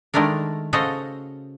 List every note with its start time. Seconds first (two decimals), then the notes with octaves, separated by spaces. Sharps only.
0.14 D#3 G#3 A3 D4 A#4
0.73 C#3 F#4 A4 C5 D#5 F5